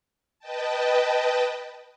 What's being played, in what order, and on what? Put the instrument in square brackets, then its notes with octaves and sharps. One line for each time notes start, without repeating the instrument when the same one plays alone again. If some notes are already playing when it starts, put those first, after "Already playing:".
[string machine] B4 D#5 G5 A5